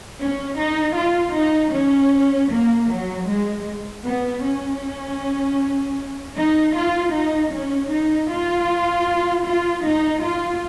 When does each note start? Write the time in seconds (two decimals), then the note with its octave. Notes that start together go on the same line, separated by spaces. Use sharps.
0.19 C#4
0.57 D#4
0.95 F4
1.34 D#4
1.73 C#4
2.50 A#3
2.89 F#3
3.28 G#3
4.05 B3
4.43 C#4
6.36 D#4
6.75 F4
7.13 D#4
7.52 C#4
7.90 D#4
8.30 F4
9.45 F4
9.84 D#4
10.23 F4